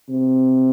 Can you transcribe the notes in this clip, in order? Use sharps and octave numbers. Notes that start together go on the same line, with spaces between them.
C3